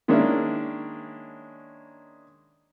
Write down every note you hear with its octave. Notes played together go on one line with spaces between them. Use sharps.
D#3 G#3 A#3 C#4 D4 E4